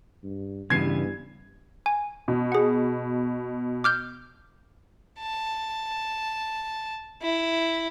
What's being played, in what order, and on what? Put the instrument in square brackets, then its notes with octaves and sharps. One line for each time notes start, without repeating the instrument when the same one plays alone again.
[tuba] G2
[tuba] G2 [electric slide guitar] C#3 E3 B3 [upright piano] G#6 C7
[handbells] G#5
[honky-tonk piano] B2
[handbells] G#4 F#5
D6 F6 G6
[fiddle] A5
E4